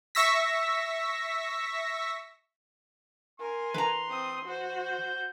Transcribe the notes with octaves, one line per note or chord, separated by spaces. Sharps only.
E5 C#6 E6 A#6 B6
A#4 G#5 C6
E3 B4 A#5
C4 D#6
F#4 C5
G6